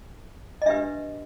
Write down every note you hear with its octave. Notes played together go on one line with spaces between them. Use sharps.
D#5
D4 G4 B4 E5